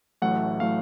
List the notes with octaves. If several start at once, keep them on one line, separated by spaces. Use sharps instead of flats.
A1 A2 F#3 A3 F#5
A2 F#3 A3 F5